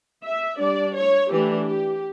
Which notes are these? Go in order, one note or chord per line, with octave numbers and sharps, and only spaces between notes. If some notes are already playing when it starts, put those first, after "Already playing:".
E5
G3 D4 D5
C#5
E3 A3 D4 G4
G4